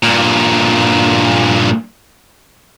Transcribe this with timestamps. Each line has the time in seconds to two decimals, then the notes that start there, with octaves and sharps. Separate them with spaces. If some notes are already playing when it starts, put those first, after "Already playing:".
0.04 G2 A#2